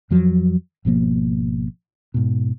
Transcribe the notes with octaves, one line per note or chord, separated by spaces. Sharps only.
F2 F3 F#3
G#1 B2 F3 A#3
G#2 B2